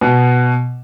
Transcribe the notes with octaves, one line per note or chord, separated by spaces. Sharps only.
B2